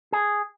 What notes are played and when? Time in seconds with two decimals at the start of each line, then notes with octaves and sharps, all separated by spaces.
0.12 G#4